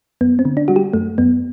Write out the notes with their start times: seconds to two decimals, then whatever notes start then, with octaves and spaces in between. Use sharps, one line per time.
0.21 F#2 B3
0.39 C4
0.45 D3
0.57 D4
0.68 G3 F#4
0.76 G4
0.93 F#2 A3
1.18 F#2 B3